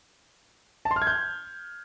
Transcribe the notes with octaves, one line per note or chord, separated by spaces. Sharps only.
A5
C6
F6
G#6
G6